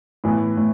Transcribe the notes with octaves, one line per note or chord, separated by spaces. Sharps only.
A2 E3 B3
A2